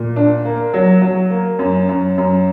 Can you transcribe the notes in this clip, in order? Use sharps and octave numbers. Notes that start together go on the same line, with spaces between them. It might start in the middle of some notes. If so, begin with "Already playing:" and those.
Already playing: A#2
D4
A#3
F#3
F#3
A#3
F#2
F#2
F#2